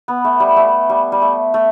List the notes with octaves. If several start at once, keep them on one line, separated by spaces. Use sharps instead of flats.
B3
A3
G3
A3
G3
G3
A3
A3